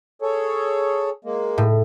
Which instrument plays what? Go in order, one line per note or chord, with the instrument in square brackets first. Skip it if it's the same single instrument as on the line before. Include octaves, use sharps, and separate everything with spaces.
[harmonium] G#4 A4 C#5
G#3 A#3
[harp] A2